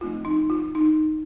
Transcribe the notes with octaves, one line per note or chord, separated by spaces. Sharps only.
F3 A3 C4 D#4 F4
D#4
F4
D#4